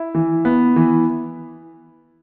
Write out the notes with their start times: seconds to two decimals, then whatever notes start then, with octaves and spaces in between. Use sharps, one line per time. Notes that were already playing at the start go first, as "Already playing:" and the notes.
Already playing: E4
0.15 E3
0.45 B3
0.76 E3